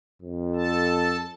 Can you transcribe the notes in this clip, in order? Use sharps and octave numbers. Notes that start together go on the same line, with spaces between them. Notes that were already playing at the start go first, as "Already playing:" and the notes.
F2
A4 A5